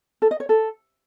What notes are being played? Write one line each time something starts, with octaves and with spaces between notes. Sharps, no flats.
A4
D#5
C#5
A4